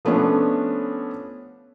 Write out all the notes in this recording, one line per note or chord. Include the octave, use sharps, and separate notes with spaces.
F3 A3 B3 C#4 D4